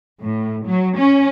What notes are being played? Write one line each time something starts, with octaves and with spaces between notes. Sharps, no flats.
A2
F#3
C#4